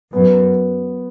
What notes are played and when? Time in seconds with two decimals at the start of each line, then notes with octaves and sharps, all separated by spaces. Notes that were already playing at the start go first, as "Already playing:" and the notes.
0.13 F#2 B3